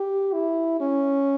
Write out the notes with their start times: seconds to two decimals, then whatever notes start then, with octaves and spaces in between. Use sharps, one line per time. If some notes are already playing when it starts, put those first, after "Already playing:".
Already playing: G4
0.33 E4
0.80 C#4